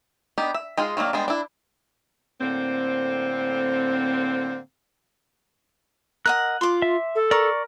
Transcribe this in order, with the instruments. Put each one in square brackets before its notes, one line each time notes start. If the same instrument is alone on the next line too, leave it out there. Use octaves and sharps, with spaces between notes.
[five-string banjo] B3 D4 D#4 G4
E5
G#3 D#4 F4 G#4
D#3 F#3 G#3 A#3 D4
G3 G#3 B3 D4
D4 E4
[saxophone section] A2 D3 A#3 C4
[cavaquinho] A#4 D#5 F#5 [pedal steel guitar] F#6
[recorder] F4 [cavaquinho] C6 D6
[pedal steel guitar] E5
[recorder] A4
[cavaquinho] A#4 [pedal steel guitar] D5 C#6